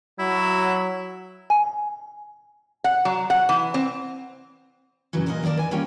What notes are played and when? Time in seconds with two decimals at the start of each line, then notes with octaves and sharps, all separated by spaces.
0.19 F#3 E4
1.50 G#5
2.84 F#5
3.05 F#3
3.30 F#5
3.49 E3
3.74 C4
5.13 G2 C#3 E3 F#3
5.26 A#2 A#3 B3 G#4 C#5 D#5
5.42 D#3 A#3 A#4 D5 A5
5.57 E3 G#5
5.71 G3 A#3 C#4 F4 C#5 G5